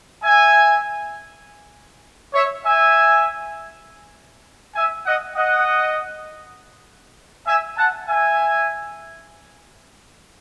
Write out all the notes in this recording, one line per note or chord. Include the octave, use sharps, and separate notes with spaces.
E5 G#5
C#5 E5
E5 G#5
E5 G#5
D#5 F#5
D#5 F#5
E5 G#5
F#5 A5
E5 G#5